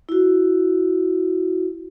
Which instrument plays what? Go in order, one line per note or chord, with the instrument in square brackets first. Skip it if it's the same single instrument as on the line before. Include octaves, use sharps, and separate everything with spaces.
[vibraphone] E4 F#4